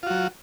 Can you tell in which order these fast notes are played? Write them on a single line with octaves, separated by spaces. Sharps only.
F4 F#4 F#3